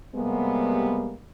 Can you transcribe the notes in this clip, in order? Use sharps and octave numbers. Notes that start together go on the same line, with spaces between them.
C3 G3 G#3 A#3 B3